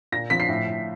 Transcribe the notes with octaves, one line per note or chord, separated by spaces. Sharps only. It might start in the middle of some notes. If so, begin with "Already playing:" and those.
A#2 A#6
F3 B6
C7
A2
A2